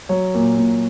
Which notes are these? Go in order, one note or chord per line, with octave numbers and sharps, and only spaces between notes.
F#3 C#5
A#2
A#2